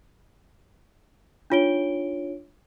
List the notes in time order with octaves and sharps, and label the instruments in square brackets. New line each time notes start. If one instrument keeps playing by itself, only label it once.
[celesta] D4 D#4 F4 C#5 D7 G7